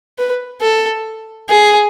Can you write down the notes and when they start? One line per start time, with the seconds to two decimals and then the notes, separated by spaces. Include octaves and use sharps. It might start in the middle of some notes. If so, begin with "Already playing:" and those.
0.18 B4
0.61 A4
1.49 G#4